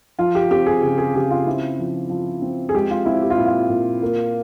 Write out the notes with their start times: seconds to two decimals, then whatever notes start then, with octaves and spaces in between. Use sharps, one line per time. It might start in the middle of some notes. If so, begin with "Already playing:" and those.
0.19 F3 F4
0.35 G4
0.51 C4 G4
0.66 G#4
0.82 C#3 G#4
0.98 G#4
1.15 C#3 G4
1.31 F4
1.47 C4 E4
1.79 F3
2.10 F3
2.42 C4
2.69 G#4
2.74 G#3 G4
2.91 F4
3.06 C4 E4
3.22 G4
3.30 F4
3.38 A#2 E4
3.46 F4
3.70 A#2
4.02 A#3